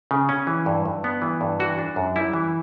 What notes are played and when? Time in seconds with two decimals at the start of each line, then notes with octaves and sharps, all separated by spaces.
0.11 C#3
0.29 C#4
0.47 E3
0.66 G2
0.85 G2
1.04 B3
1.22 E3
1.41 G2
1.60 E3 F#4
1.78 D4
1.96 F#2
2.16 G3 E4
2.33 E3